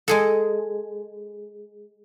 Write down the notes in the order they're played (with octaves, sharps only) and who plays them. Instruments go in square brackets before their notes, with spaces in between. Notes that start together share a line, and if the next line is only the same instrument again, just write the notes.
[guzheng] G#3 G#4 A4